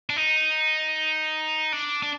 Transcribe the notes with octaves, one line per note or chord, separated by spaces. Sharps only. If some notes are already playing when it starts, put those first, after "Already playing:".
D4
D#4
D4
D4